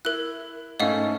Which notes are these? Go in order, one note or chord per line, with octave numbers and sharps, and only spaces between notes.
E4 A#4 F#6
G#2 A3 C#4 D#5 F5 F#5